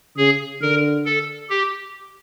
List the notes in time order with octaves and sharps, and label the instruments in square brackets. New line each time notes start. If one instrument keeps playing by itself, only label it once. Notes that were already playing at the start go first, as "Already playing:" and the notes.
[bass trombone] C#3 [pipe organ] G#4
[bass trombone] D3 [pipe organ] A#4
[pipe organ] A4
G4